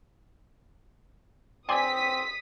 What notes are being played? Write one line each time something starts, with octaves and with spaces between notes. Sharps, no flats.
C4 D5 G5 G#5 C6 D6 D#6 B6